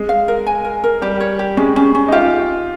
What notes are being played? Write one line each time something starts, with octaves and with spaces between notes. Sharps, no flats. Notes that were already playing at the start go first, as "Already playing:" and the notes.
Already playing: G#3
F5
A#4
G#5
A#4
A#4
G3 G4
C#5
G4
G#3 C#4
C#4
C#4
D#4
F4 G4